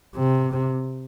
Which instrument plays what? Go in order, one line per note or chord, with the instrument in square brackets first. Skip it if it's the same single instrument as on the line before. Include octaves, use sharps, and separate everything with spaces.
[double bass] C3